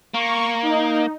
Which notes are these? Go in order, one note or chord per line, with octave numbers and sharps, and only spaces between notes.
A#3 C#6
D#4